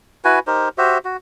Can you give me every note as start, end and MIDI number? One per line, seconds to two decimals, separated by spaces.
0.25 0.39 64
0.25 0.39 66
0.25 0.39 71
0.25 0.39 80
0.47 0.69 63
0.47 0.69 67
0.47 0.69 70
0.47 0.69 72
0.78 0.98 66
0.78 0.98 67
0.78 0.98 72
0.78 0.98 76
1.05 1.17 66